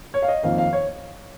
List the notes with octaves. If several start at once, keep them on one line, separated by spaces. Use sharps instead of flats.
C#5
F5
D#5
F2 D#3 A#3 F5
F5
C#5